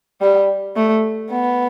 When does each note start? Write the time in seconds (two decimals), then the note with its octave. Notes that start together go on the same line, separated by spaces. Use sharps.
0.21 G3
0.76 A3
1.30 B3